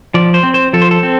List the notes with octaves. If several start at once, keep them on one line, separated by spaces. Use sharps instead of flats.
F3 D5
C5
C4
C5
F3 A4
C5
A4
C4